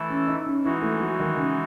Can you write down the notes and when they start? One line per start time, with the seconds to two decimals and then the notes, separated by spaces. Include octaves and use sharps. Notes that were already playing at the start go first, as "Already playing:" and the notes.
Already playing: E3 A3 E4 A4
0.10 C#4
0.27 D#4
0.47 C#4
0.64 E3 G#3 D#4 E4 F#4
0.82 A3
1.01 F#3
1.19 D#3
1.37 C#3